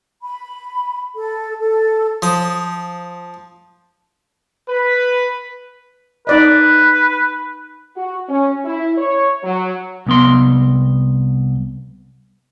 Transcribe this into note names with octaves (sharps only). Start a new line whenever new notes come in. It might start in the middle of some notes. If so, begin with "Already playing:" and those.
B5
A4
A4
F3 D#6
B4
D#4 B4 D5 D#5
F#4
C#4
E4
C#5
F#3
C2 B3 C6